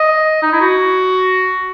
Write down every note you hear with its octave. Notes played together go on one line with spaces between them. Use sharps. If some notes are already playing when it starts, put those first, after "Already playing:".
Already playing: D#5
D#4
E4
F#4